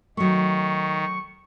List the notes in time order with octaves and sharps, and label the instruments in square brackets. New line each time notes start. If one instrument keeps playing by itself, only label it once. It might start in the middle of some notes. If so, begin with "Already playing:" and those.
[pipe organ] D#3 [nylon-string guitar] F#3 A3 [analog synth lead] C#6